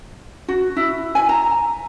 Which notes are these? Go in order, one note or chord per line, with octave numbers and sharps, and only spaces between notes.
F#4
E4
G#5
A#5